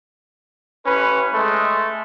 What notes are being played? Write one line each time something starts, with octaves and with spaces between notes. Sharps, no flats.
A1 C#4 B4
G#3 A3